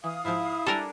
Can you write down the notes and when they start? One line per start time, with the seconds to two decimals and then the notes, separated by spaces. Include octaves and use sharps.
0.04 E3 F5 D#6
0.25 G#2 F3 E4
0.66 G3 D4 A4 A#4 G#5